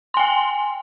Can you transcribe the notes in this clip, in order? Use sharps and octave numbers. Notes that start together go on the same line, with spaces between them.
G5 G#5 C6